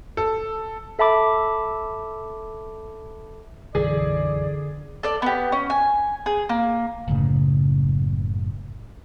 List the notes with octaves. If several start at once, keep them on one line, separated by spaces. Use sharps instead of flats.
A4
A4 E5 A5 B5 D6
B1 F#2 D3 E3 G#4 D5
A4 D5
B3 G4
C#4
G#5
G#4
A#3
F#1 A2 C#3